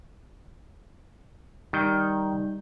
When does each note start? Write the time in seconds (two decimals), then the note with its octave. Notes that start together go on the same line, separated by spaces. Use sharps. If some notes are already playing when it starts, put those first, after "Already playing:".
1.73 D#3 G3 D#4 G6